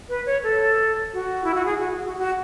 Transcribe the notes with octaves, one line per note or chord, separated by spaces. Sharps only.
B4
C#5
A4
F#4
E4
F#4
G#4
F#4
F#4
F#4